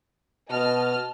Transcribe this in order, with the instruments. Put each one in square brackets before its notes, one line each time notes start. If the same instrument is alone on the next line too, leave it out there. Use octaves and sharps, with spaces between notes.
[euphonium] B2 [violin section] D#5 A5 F6